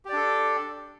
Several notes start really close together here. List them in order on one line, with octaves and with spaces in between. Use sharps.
G4 D5 D4 A4